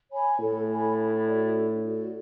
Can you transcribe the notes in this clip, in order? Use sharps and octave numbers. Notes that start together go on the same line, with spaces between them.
C#5 G#5 B5
A2 A4
C#5 G#5 B5
D4
F#4 A4 D5
D4
F#4 A4 D5